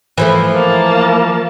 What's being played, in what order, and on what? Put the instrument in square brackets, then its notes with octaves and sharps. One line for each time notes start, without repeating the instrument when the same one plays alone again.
[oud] E3 F3 A3
[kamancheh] A#3 A5